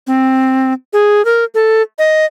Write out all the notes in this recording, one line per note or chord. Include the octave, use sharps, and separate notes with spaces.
C4
G#4
A#4
A4
D#5